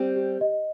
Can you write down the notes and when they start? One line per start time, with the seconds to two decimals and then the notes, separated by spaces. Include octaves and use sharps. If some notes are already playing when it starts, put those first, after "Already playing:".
Already playing: G3 C4
0.16 G4
0.41 D#5